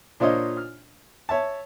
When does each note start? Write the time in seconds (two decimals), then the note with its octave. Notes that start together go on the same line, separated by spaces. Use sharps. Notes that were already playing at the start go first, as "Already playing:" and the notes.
0.20 A#2 D4 F4 C5 C#5 D#5
0.57 F6
1.29 C#5 E5 A5